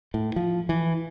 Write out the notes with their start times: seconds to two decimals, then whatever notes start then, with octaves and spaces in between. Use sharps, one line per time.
0.14 A2
0.36 F3
0.69 E3